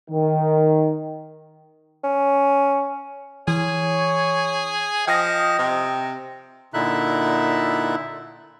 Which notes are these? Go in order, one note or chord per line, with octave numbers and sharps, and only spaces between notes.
D#3
C#4
E3 G#4 C#5
F3 D#5 G5 D#6 A#6
C3
A#2 D3 D#4 E4 E5 F#6